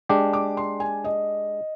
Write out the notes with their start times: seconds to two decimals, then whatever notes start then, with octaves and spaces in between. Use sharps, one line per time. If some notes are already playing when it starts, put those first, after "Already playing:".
0.09 G#3 D4 G4
0.33 D6
0.57 C6
0.80 G#5
1.04 D#5